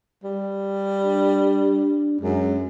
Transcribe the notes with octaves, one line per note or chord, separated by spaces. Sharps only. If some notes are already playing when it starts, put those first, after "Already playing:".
G3
D4
F#2 G#3